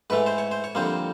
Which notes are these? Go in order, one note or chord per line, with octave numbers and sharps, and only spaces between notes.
G#2 E3 A3 B4
C5
C#5
C5
C#5
F2 D3 G3 A#3 C5